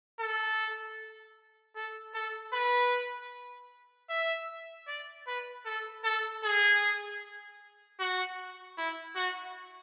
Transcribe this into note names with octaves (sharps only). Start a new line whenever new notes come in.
A4
A4
A4
B4
E5
D5
B4
A4
A4
G#4
F#4
E4
F#4